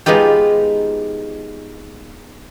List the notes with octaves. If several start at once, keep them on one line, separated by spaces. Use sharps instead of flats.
G#3 B3 D#4 F4 G4